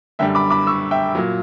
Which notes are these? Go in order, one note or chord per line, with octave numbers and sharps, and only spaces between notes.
F#2 D3 G3 E5 G5
B5 D6
B5 D6
C#6 E6
E5 G5
A#2 F#3